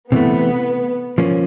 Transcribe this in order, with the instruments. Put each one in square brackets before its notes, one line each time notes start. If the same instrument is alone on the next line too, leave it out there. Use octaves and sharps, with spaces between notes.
[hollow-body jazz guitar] C3 E3 A3 [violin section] B3
[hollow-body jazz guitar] F3 A#3 C#4